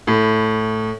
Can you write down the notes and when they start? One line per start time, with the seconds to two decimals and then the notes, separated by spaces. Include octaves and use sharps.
0.07 A2